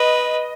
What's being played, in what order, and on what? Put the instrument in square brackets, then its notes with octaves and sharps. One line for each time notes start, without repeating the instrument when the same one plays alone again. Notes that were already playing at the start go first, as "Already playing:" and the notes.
Already playing: [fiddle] B4 [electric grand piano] D#5